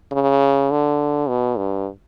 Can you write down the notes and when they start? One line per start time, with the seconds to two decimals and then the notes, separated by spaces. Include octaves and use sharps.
0.12 C#3
0.71 D3
1.29 B2
1.58 G2